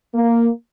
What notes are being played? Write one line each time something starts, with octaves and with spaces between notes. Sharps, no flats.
A#3